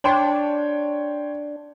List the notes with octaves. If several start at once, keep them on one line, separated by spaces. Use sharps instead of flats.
D4 C#5 G5 C6